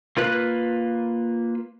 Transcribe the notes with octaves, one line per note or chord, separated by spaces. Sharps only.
A#3 F4 B4 F#6